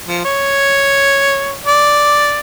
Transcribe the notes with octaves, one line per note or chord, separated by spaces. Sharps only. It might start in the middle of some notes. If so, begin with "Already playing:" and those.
F3
C#5
D5